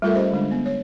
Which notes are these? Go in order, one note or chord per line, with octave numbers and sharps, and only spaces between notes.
G3 A3 F4 A4 A#4 E5
C#4 G4 C5 D#5
D3 G#3 D4
B3
C#5